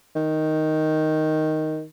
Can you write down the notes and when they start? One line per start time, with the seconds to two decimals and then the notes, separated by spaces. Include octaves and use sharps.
0.15 D#3